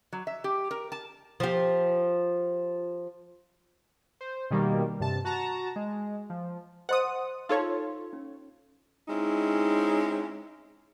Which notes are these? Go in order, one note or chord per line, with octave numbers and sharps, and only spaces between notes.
F#3
E5
G4
A#4
A5
F3 G4
C5
B2 D#3 G3 A#3
G2 C3 A5
F#4 A5 A#5
G#3
F3
C5 D#5 F#5 C6 D#6
D#4 F4 A4 C#5 F5 C6
C#4
G#3 C4 C#4 D#4 E4